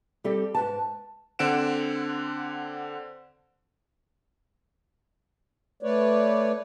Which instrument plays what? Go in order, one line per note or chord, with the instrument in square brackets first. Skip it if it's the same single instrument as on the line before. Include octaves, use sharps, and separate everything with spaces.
[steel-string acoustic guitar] G3 C4 G4 A4
G#2 B4 A5
[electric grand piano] D3 C4 D4 F#5 D7 E7
[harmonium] A3 B4 C#5 D5